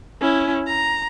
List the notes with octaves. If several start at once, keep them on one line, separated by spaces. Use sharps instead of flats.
C#4 E4
A#5